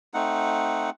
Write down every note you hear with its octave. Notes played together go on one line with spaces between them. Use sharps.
A3 C4 D#4 F#5